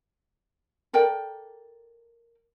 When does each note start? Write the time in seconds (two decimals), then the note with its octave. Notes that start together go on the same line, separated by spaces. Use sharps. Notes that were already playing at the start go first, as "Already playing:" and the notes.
0.93 A4 A#4 D5 G5